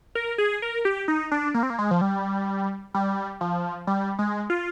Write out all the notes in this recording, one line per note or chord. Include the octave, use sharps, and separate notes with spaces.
A#4
G#4
A#4
G4
D#4
D4
A#3
C4
A#3
G#3
F3
G3
G3
F3
G3
G#3
F4